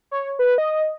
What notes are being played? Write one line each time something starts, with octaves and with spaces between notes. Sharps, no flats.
C#5
B4
D#5